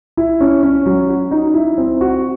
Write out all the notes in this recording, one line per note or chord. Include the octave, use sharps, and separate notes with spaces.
E4
C#4
C#4
F#3
F#4
D#4
E4
C4
F#4